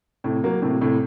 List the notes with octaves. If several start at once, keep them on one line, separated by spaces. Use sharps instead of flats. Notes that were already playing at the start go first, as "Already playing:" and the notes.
A2 C3
F#3 A#3
A2 C3
A2 C3